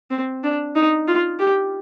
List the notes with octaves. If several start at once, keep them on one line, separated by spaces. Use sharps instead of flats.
C4
D4
D#4
F4
G4